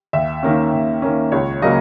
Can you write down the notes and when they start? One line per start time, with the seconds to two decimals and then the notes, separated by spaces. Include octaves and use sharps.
0.13 D#2 E5
0.43 D#3 A#3 C#4
0.73 D#2
1.02 D#3 A#3 C#4
1.32 C#2 C#5
1.62 C#3 F#3 A#3 D#5